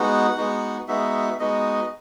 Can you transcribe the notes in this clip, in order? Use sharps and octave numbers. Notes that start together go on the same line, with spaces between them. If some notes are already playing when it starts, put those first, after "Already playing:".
Already playing: G#3 B3 D#4 F#4 F#5
G#3 B3 D#4 F#4
G#3 B3 D#4 F#4 E5
G#3 B3 D#4 F#4 D#5